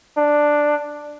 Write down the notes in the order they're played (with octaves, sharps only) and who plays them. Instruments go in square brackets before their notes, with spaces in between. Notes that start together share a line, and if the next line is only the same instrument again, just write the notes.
[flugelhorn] D4